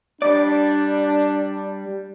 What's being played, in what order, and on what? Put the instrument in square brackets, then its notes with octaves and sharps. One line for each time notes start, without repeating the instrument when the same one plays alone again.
[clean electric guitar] G3 D5 [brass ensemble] D4